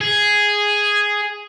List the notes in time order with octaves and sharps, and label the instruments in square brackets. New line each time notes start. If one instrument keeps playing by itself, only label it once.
[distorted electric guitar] G#4